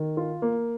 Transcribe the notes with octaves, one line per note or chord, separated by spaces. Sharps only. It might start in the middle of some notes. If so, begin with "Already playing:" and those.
Already playing: D#3
F4
A#3